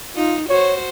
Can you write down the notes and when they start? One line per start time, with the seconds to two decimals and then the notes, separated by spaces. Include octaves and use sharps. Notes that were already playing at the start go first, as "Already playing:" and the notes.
0.16 D#4 F4
0.49 F#4 C5 C#5